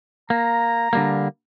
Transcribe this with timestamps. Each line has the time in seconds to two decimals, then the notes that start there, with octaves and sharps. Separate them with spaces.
0.30 A#3 A#5
0.93 D3 G3 A#3